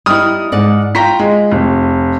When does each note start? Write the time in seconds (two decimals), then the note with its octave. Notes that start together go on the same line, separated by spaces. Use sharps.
0.06 G3 D#4 E4 D#6 F6
0.52 G#2 D5 F#5
0.95 F4 G5 A#5 B6
1.19 G#3
1.51 F1